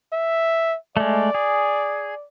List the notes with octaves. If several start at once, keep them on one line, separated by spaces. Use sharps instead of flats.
E5
G#3 A3 D5
G#4